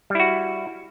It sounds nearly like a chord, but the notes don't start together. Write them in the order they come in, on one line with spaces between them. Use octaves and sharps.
G3 E4 F#4